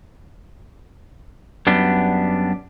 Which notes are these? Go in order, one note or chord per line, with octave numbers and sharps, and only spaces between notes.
F#2 G3 B3 D4